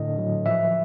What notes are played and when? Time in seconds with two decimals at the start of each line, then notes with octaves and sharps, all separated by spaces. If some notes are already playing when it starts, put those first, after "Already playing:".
Already playing: A2 D3 D#5
0.18 F#3
0.46 F3 E5